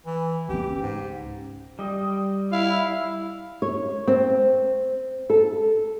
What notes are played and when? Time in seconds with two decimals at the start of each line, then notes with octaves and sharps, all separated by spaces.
0.06 E3
0.49 C#2 C#3 G4
0.81 G#2
1.79 G3 D#5
2.52 E4 F5
3.62 C#5
4.07 C4
5.30 A4